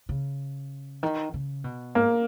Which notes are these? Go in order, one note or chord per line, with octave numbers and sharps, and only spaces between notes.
C#3
D#3
C#3
B2
G#2 A#3